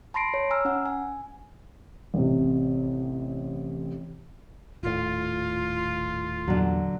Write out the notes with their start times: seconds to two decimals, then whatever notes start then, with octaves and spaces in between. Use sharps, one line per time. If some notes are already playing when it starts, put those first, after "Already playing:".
0.14 A5 B5 C6 A#6 C7 D7
0.34 C#5
0.50 G#5 A#5 E6 F6
0.65 C#4 F#5
0.86 G#5
2.14 A1 C3
4.83 D#1 A2 F4
6.48 E2 G2 A#2 D3 F#3